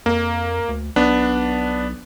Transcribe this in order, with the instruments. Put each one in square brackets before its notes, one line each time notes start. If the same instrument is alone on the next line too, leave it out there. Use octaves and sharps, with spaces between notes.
[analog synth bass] F2 [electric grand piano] A#3
[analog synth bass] D2
[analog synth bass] B1 [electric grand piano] B3 D4